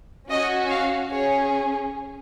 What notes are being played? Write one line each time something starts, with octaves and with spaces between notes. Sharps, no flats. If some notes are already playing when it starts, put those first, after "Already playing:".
C#4 F#4 D#5
F5
C#4 G#4 C#5